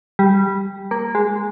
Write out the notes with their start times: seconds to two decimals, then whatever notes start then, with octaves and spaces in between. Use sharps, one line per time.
0.19 G3
0.91 A#3
1.15 G#3